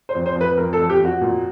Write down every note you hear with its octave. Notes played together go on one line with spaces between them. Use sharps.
C5
F2
C5
F2
B4
F2 A#4
A4
F2
G4
F2 F#4
A#2